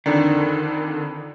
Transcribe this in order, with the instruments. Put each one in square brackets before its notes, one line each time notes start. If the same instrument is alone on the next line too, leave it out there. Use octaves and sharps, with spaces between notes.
[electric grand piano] F2 D3 D4 [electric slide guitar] D#3